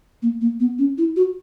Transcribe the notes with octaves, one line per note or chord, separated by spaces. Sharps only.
A#3
A#3
B3
C#4
E4
F#4